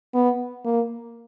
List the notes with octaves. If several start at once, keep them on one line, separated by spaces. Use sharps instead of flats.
B3
A#3